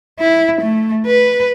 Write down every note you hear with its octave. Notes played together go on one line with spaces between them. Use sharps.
E4
A3
B4